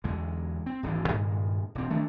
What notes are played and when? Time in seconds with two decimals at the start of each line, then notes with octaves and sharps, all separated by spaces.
0.04 E2 D3 G#3
0.66 C4
0.83 D1 G#1 D3 E3
1.09 G2 A#2 D#3 G#3
1.75 E1 C4
1.90 D#3 A3 A#3 D4